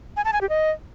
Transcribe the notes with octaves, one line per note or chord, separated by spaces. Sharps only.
G#5
A5
G#5
G4
D#5